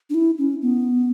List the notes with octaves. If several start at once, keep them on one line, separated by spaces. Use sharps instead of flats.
D4
E4
C#4
B3